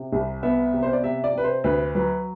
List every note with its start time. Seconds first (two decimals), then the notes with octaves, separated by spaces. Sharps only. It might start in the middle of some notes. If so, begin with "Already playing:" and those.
Already playing: C3
0.12 C2
0.43 B3 E5
0.74 C3
0.83 C5
0.93 D5
1.04 C3 E5
1.24 D5
1.34 C3 B4
1.44 C5
1.64 D2 B4
1.95 F#3 B4